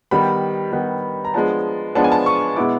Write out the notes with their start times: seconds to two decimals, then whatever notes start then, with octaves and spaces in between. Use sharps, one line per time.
0.11 D#3 G3 B3 B5
0.73 D#3 G3 B3
1.25 A#5
1.34 F3 G#3 B3 D4 F4 A5
1.95 F3 G#3 B3 D4 F4 A5
2.04 G#5
2.12 A5
2.26 C#6
2.56 B2 G#3 B3 E4 D6